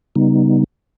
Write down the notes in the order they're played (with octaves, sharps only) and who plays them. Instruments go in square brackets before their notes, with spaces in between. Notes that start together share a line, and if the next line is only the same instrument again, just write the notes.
[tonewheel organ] C#3 G3 B3 D#4